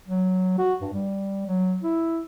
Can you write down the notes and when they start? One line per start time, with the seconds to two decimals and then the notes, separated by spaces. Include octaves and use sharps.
0.08 F#3
0.59 F#4
0.81 G2
0.94 G3
1.47 F#3
1.83 E4